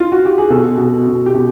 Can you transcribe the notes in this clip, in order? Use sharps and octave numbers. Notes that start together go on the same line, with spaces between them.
F4
F#4
G4
G#4
B2 A4
B2
B2
G4
B2